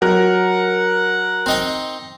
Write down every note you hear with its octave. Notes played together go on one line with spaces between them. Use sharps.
F#3 A#4 F#5 F#6
C4 D#4 G5